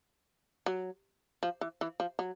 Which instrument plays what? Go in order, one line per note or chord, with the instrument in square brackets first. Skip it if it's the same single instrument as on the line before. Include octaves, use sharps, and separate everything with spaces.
[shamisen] F#3
F3
E3
E3
F3
F#3